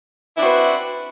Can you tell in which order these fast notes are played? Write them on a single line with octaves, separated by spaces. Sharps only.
E4 D4 C4 F#4 B4